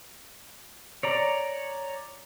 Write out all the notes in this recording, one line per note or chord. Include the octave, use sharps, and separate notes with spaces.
C#5 D5 A#5